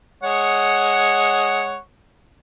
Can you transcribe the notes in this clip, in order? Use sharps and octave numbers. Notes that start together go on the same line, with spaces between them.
G#3 C#5 F#5